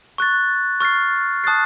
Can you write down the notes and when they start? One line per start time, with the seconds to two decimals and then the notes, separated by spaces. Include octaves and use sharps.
0.18 C#6 F#6 A6
0.81 C#6 F6 A6 C7
1.44 A5 D#6 F#6 A6 C7